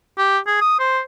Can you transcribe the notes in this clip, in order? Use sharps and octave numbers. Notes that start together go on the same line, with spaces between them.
G4
G#4
D#6
C5